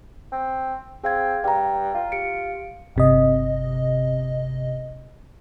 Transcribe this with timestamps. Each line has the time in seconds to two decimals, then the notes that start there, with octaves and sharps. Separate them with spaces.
0.32 C4
1.04 C4 G#4 F5 G#6
1.44 G2 G5 A#5
1.95 F4
2.12 G4 C#7 D7
2.96 G1 C3 D#5